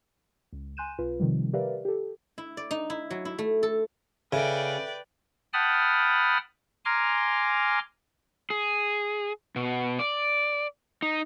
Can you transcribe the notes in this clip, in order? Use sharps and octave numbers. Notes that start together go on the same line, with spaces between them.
C#2
G#5 C6 F#6 G6 D#7 E7
B1 F4 B4
C3 D#3 F3 G3
G4 A#4 B4 D5 E5 F5
G4 A4
E4
D5
D#4
E4
F#3
E4
A3
A4
C#3 A4 B4 D5 E5 G5
F#5 G5 A5 B5 D#6 F6
G#5 A#5 C6 D6 F6
G#4
B2
D5
D#4